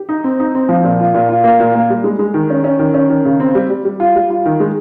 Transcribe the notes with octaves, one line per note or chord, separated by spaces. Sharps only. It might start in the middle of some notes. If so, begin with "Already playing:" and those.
Already playing: G4
D#4
C4
D#4
C4
F3
A#2
F4
A#2
F4
A#3
A#2
A#3
G3
G#3
G#3
D#3
C#4
C#4
D#3
C#4
D#3
C#3
C4
G3
G3
G3
F4
G3
F4
D#3
G#3